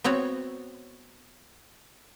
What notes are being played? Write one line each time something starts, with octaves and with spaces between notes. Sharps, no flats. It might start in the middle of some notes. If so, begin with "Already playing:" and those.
B3 C4 F#4 C#5